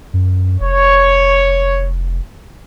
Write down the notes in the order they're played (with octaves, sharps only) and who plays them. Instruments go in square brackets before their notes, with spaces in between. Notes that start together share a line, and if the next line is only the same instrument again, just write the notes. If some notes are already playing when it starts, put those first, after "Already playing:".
[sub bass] F#2
[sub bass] F1 [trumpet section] C#5